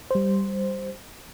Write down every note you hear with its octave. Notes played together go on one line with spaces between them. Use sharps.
G3 C5